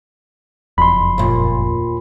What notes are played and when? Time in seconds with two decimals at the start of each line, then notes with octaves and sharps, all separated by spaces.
0.78 F#1 F2 B5 C6
1.18 D#2 A#2